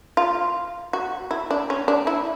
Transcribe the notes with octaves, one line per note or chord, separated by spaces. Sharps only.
F4
F#4
E4
D4
C#4
D4
E4